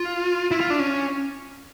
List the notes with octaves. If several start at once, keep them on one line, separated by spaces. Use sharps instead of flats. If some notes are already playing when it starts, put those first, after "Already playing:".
Already playing: F4
E4
F4
D4
C#4